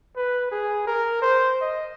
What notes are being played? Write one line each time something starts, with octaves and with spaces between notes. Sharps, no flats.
B4
G#4
A#4
C5
D#5